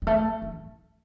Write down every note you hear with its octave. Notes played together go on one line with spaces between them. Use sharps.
G3
A3
E3